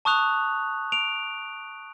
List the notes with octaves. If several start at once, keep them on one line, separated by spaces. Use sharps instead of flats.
A5 C#6 D#6 F#6 F7
D7 F7